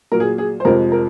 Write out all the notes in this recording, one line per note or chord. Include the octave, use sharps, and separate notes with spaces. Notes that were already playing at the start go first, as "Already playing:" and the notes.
A#2 F#3 A#4
G#4
G#4
C5
F2 C3 F3 G#3 A#4
A#4